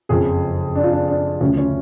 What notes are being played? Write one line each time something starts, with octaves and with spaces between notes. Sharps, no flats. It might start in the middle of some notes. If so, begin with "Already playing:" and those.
F#1 F2 C#3 F3 G#4
D4
F4
D4
D4
D2 C#3 F3 C#4
C#4